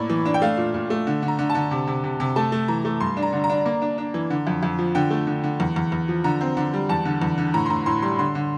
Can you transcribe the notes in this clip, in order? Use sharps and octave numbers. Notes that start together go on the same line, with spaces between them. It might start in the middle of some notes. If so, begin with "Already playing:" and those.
Already playing: A2 A#3 D5
E3
D4
G5
A3 F5
A#2
A#2
A3
D3
D3
A#5
D3
A5
D3
C3
C3
C3
C3
A3 A5
A3
E3 A#5
A3
G2 C6
D4
A#5
D3
A#5
D4
A#3
D4
D4
E3
D3
F2
F2
F3
D3 G5
A3
D3
D3
E2
E2
E2
F3
D3 A#5
C4
D3
G3
E2 A5
D3
E2
D3
A2 A#5
C6
A2 A#5
A2 C6
G3 C6
D3 C6
D3